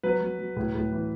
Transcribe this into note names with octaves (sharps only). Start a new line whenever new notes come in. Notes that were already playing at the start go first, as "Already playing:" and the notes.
F#3 B4
F#3
F#3
A2
A2
E3